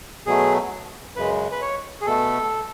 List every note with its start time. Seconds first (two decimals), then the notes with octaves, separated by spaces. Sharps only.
0.26 B2 F#3 A3 G#4
1.16 F#2 C#3 G#3 B4
1.52 B4
1.62 C#5
2.01 G#4
2.06 B2 A3 A4